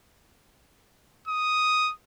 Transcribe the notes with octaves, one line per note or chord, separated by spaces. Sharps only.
D#6